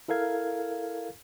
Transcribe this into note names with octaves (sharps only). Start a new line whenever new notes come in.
E4 A4 A#4 F5 G#6